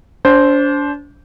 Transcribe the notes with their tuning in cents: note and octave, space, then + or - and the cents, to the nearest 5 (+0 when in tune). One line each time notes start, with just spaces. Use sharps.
D4 -35 C5 +0